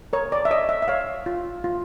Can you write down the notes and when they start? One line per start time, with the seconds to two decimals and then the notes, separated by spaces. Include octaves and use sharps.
0.13 A#4 C#5
0.32 D5
0.45 E5
0.51 C#5 D#5
0.69 E5
0.82 E5
0.88 C#5 F5
1.26 F4
1.64 F4